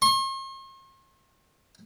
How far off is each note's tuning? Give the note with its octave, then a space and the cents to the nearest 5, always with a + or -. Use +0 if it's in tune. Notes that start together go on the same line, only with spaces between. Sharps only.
C6 +45